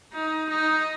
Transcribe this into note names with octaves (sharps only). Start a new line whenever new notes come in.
D#4
D#4